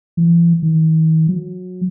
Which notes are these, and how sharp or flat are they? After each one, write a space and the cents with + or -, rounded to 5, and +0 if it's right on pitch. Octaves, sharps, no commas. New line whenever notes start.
E3 +45
D#3 +45
F#3 -25